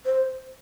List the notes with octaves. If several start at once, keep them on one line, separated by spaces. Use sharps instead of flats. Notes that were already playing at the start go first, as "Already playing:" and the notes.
C5